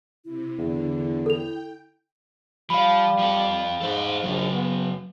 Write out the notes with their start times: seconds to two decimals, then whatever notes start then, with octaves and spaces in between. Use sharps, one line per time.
0.25 C3 E4
0.58 E2 D3
1.26 E4 A4 G5 F7
2.70 F3 G3 F5 B5
3.18 F3 A4
3.81 G#2 A4 C5
4.23 A#1 C#3 F#3
4.52 B3